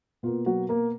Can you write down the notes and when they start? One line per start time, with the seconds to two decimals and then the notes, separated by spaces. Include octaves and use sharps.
0.23 B2 A#3 F4
0.46 F#3 F#4
0.69 A#3 A#4